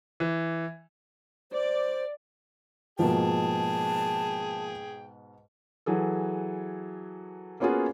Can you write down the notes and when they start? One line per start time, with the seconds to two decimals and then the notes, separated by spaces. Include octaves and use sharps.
0.20 E3
1.52 C5 D5
2.99 G#2 B2 F3 A#3 G#4 G5 A5
5.86 E3 F#3 G#4 A4
7.60 A#3 B3 C#4 F4 F#4 G#4